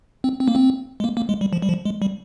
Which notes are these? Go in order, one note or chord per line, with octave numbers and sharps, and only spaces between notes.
C4
C4
A#3
C4
G#3
A#3
A#3
G#3
G3
F3
G3
F3
G#3
G3